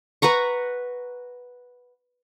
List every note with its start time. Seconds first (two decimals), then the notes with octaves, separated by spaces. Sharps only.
0.22 B4 F#5 A#5 C#6